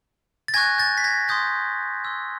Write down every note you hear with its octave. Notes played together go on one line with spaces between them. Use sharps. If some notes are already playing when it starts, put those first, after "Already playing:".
A6
G#5 C#6 F#6 G#6 A#6
G6 A6
B6
G#6 A#6
C6 D#6 G6 A6
C6 E6 G6